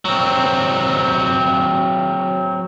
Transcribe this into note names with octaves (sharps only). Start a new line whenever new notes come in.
F#3 C4